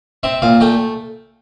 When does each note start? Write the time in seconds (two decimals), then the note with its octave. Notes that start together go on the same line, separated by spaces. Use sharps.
0.23 C4 E5
0.42 A#2 F5
0.60 A3 G5